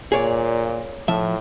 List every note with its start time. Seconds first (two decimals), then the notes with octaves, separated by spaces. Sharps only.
0.12 A#2 G#4 C#5 D5
1.08 A2 F3 E5